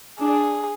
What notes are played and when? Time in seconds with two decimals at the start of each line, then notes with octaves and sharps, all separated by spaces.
0.20 D4 G#4